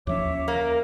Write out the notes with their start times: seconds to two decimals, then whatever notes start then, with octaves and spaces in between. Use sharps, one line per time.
0.07 D#2 F3 C#4 C#5 E5 D6
0.48 A#3 A#4